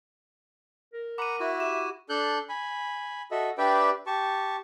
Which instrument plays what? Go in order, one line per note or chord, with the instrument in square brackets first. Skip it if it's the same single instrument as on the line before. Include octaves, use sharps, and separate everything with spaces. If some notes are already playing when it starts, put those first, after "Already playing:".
[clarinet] A#4
[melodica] F#5 A#5 B5 [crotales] D6 D#7
[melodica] E4 F#4 [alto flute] E5
[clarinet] G4 [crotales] E7
[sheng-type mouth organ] D4 A4 F#6 G6
G#5 B5
F#4 A4 D#5 E5
D4 G4 B4 D5 E5 G5
G4 A5 C#6